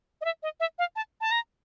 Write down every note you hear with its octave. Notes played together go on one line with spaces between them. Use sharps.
D#5
E5
D#5
E5
F5
A5
A5
A#5